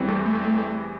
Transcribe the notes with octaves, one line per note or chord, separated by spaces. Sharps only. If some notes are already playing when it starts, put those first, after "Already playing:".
Already playing: E2 E3 G3 C4
A3
A3